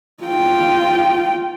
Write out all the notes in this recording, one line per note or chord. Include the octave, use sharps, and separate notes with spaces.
F4 G5